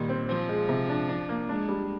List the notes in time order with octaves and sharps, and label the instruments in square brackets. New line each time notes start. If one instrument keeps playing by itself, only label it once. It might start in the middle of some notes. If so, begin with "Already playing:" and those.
Already playing: [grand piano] A#2 G3 [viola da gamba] D#3
[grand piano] C4
[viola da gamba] F3 [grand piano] C4
[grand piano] G#3
C3
D4
D4
A#3
[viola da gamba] G#3 [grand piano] D4
[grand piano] G3